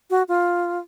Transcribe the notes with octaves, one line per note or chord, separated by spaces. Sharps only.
F#4
F4